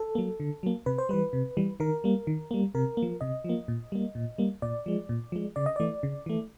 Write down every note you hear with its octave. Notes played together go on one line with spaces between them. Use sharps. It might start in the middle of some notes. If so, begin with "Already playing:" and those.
Already playing: A4
F#3 A#3
D3
F#3 A#3
C3 B4
C5
E3 G3 B4
C3
E3 G3
D#3 A#4
G3 A#3
D#3
G3 A#3
C3 A#4
A#3
F3
C3 D#5
F3 A#3
A#2
G3 A#3
A#2
G3 A#3
A#2 D5
F3 G#3
A#2
F3 G#3
C#3 D5
D#5
E3 A3 D5
C#3
E3 A3